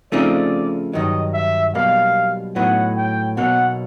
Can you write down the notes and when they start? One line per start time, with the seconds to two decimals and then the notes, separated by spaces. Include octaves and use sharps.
0.12 C#3 F3 A3 C4 D#4 D5
0.93 G2 D#3 F#3 D#5
1.34 E5
1.75 B1 B2 G3 A#3 F5
2.56 A2 F#3 B3 D#4 F#5
2.96 G5
3.37 B1 B2 F#3 A#3 F#5